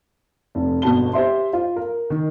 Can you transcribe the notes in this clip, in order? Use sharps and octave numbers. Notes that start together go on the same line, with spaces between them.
F1
G1 B2 F#4 A5 G7
G4 C5 E5 C6
F4
A#4
D#3